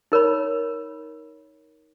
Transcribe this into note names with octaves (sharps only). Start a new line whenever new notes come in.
D#4 A#4 C#5 B5